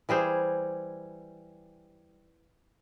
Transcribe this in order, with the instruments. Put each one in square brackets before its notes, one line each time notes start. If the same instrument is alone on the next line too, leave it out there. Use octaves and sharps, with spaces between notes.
[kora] E3 G3 G#4 C5